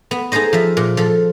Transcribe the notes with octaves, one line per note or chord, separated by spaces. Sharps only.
B3
D#4 G#4 A4 C5 D#5
F3 E5
A#2
F3 A4